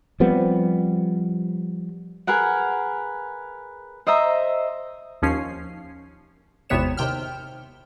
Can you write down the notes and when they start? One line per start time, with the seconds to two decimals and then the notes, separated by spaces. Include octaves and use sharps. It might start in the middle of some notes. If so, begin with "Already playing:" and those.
0.20 F3 G3 B3 C4
2.27 G#4 A#4 B4 F#5
4.07 C5 D#5 E5 A#5
5.22 D#2 F3 C#4 C7
6.69 G#1 E2 C3 B3 C#5 E7
6.97 D#2 C3 G5 F6